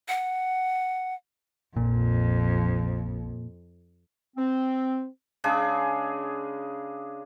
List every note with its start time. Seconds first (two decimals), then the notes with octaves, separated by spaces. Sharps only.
0.08 F#5
1.76 A#1 F2 A#2
4.37 C4
5.44 C#3 G#3 D4 G#4